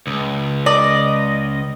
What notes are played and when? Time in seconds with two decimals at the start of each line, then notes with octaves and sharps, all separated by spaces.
0.07 C#2
0.66 D5 D#5